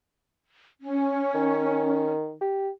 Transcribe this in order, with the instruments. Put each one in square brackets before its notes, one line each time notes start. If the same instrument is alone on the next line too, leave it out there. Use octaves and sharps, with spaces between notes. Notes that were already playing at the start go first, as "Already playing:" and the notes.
[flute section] C#4
[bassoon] D#3
G4